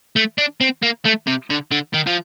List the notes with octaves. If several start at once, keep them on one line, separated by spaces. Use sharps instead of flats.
A3
D4
C4
A#3
A3
C3
D3
D3
D#3
F3